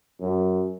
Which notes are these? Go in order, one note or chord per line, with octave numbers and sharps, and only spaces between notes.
F#2